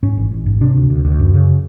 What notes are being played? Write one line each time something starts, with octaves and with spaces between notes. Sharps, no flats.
G#2 C#4
A1
A1
G#2
C3 D4
D2
D2
D2
F#2
C#3